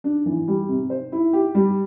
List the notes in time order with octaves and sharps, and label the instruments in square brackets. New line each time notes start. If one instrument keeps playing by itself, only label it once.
[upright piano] D4
E3
G3
C3
C5
E4
G4
G3